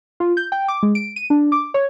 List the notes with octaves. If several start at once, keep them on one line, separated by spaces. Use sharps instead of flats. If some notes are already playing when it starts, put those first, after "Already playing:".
F4
G6
G5
D6
G#3
D7
D#7
D4
D6
C#5